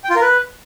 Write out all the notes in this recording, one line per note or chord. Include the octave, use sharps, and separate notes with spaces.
G5
F4
A#4
B4